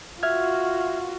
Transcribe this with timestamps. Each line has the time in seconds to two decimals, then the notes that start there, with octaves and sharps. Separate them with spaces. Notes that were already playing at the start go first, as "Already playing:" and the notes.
0.23 F4 F#4 E5 F6 G#6